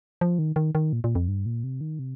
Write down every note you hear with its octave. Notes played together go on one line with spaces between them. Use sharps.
F3
D#3
D#3
D#3
A#2
A#2
F2
G2
A#2
C3
D#3
C3